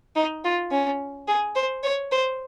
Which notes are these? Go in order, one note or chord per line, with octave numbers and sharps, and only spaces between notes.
D#4
F4
C#4
G#4
C5
C#5
C5